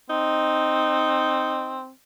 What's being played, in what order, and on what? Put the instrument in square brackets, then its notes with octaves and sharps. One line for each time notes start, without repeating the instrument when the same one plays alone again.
[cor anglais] C4 [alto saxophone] D#4